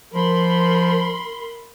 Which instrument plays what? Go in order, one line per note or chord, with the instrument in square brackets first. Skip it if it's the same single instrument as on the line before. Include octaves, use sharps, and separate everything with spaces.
[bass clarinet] F3 [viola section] A#4 B5 C6